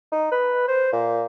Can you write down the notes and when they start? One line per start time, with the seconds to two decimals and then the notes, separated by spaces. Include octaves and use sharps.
0.12 D#4
0.32 B4
0.68 C5
0.93 A#2